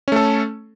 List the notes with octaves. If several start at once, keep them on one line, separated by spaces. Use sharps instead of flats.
A3 C#4 A4